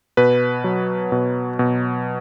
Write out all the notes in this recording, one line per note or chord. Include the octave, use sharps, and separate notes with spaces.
B2 B4
F#3
B2
B2